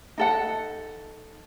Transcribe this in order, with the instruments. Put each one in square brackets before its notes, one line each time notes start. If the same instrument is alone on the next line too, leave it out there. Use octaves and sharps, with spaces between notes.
[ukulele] D#4 A4 F#5